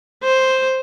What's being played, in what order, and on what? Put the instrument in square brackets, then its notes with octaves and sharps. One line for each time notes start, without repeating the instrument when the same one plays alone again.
[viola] C5